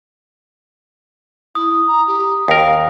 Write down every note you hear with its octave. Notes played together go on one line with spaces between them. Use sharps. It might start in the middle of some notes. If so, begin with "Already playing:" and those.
E4 D#6
A#5
G4
D#2 A#4 F5